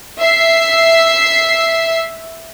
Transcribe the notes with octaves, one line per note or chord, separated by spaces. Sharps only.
E5 C7